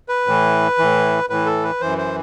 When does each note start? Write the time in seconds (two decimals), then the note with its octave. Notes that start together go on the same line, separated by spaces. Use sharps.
0.09 B4
0.27 A2 E3
0.78 A2 E3
1.30 A2 E3 B4
1.46 A4
1.63 B4
1.81 F#2 E3 C5
1.98 C5